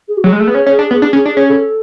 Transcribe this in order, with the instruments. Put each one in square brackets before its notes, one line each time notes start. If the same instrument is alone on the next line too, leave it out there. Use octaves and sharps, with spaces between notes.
[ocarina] G#4
F#4
[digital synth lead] F#3 [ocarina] G#4
[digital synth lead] G#3
A3
B3
C#4
C#4
D4
B3
D4
C#4
D4
C#4
[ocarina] A4